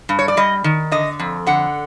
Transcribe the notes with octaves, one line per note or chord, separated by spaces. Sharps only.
G2
C#5
D5
G3 D#5
D#3
D3 D#5
F2
D3 F#5